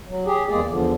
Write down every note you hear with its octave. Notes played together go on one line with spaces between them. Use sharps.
F#3
G4 G#4
E2 G#3 A#3 G#4 D5
E2 D3 F3